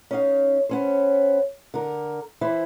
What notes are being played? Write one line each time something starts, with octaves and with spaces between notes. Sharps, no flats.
C#4 D#4 F5
B3 C#4 C5
D3 A#4
E3 E4 C5